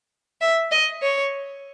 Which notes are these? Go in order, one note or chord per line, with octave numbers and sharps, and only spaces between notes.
E5
D#5
C#5